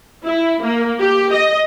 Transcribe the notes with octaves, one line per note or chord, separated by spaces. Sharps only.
E4
A#3
G4
D#5